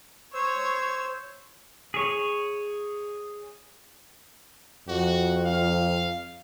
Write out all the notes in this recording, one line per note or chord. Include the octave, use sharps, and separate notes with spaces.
C5 C#5 E6
G#4 C#5
F2 F#4
F5